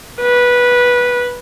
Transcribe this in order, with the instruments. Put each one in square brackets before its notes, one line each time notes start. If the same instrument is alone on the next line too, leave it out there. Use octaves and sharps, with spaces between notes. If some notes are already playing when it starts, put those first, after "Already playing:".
[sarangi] B4